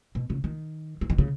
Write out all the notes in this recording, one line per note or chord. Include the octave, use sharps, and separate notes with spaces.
B2
C#3
D#3
F3
D#3
C#3